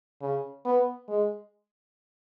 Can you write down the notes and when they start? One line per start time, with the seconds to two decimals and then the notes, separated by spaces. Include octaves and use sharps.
0.22 C#3
0.65 B3
1.09 G#3